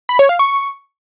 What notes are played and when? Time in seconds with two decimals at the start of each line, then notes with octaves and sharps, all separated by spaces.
0.09 B5
0.19 C#5
0.29 F5
0.39 C#6